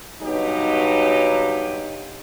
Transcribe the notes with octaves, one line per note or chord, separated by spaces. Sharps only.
G2 B2 F#3 D#4 G4 C#5